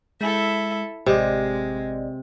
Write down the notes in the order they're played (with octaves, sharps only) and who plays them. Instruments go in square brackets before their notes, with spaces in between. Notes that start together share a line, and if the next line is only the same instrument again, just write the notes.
[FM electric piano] G#3 [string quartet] E4 A4 E5
[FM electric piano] A1 D5 D#5 [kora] C3 [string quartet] G#3